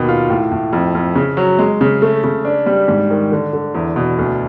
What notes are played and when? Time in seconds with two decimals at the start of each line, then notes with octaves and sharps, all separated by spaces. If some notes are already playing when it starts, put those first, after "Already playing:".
Already playing: D#2 B2
0.08 F4
0.30 A2
0.51 A2
0.73 F2
0.95 F2
1.15 C#3
1.37 F#3
1.59 G#3
1.81 C#3
2.02 A3
2.24 C#3
2.45 D4
2.66 G3
2.88 G#2
3.10 D#3
3.32 D3
3.53 D3
3.75 E2
3.96 B2
4.18 D2